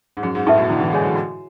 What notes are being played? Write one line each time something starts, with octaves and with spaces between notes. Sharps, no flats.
G#2
F#2 G#4
G#2
A2 B4 E5 A5 C#6
B2
D3 E4
E3
G#3 G#4 C#5 G#5
F#3
F#4